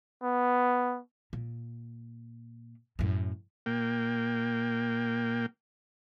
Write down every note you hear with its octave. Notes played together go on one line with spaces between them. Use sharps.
B3
A#2
F#2 A2
A#2 A#3 G5